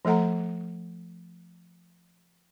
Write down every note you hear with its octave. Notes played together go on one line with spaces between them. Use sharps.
F3 A3 A4 F#5 A#5